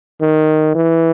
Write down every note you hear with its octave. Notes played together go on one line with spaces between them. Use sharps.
D#3
E3